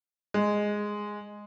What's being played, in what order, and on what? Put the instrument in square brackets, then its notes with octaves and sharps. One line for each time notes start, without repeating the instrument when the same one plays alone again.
[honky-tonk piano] G#3